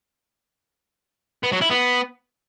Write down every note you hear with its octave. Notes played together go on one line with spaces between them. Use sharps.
B3
F#3
E4
B3